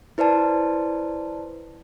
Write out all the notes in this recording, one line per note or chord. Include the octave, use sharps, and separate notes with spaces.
E4 B4 C5 D5 A5